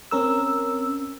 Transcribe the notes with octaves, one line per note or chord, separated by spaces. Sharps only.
C4 C#4 A#4 E6